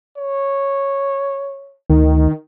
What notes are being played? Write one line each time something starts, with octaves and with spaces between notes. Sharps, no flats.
C#5
D2 D#3